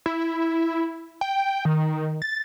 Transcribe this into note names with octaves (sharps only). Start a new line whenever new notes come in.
E4
G5
D#3
A6